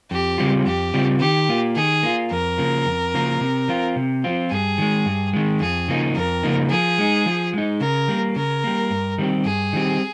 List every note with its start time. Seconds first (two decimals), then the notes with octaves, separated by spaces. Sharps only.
0.11 F2 G4
0.38 C#3 G3 C4 F4
0.66 F2 G4
0.94 C#3 G3 C4 F4
1.20 D#3 G4
1.49 A#3 F4
1.76 D#3 G#4
2.03 A#3 F4
2.31 F2 A#4
2.58 C#3 F3 A#3
2.85 F2
3.14 C#3 F3 A#3
3.41 C3
3.68 F3 C4 F4
3.96 C3
4.24 F3 C4 F4
4.51 G2 G#4
4.78 D#3 G#3
5.06 G2
5.33 D#3 G#3
5.60 F2 G#4
5.88 C#3 F3 A#3 D#4
6.15 F2 A#4
6.43 C#3 F3 A#3 D#4
6.71 F3 G#4
6.98 G#3 D#4
7.26 F3
7.53 G#3 D#4
7.80 C#3 A#4
8.08 G3 A#3
8.36 C#3 A#4
8.64 G3 A#3
8.90 G2
9.18 D#3 G3 C4 G4
9.45 G2 G#4
9.73 D#3 G3 C4 G4